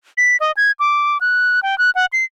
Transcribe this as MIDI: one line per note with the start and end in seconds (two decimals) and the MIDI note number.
0.17 0.37 95
0.40 0.52 75
0.57 0.72 92
0.79 1.18 86
1.21 1.60 90
1.63 1.78 79
1.78 1.90 90
1.95 2.06 78
2.13 2.25 96